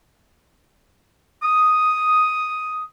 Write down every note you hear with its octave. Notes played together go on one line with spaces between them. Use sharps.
D#6